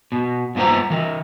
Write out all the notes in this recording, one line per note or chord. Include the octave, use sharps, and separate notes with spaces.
B2
G2 A#2 B3 F#4 C5 A#5
E3 A#4